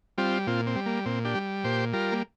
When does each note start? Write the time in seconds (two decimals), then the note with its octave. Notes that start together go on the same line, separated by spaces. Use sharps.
0.18 G3 C4 F4
0.47 A#2 C4 F4
0.67 C4
0.76 G3
0.86 A#3
1.06 A#2 C4
1.25 D4 G4
1.35 G3
1.64 A#2 G4 C5
1.93 G3 F4 A#4
2.12 A#3